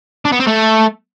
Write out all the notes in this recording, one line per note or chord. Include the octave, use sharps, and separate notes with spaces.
D4
B3
C4
A3